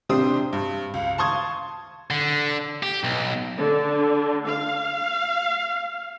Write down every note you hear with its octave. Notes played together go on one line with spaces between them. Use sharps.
C3 D4 G4 C5 D#6
G2
C#2
A5 C6 C#6 D#6 G#6
D3
G4
B1
D3
F5